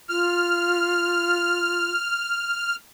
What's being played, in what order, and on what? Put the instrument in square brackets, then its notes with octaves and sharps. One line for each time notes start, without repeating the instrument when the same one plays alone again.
[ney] F4 [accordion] F6